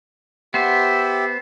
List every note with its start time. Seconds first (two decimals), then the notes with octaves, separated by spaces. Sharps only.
0.54 B3 G4 C5 E5